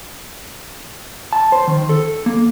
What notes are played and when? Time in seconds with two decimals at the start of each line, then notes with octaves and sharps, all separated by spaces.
1.33 A5
1.52 C5
1.68 D#3
1.89 A4
2.26 A#3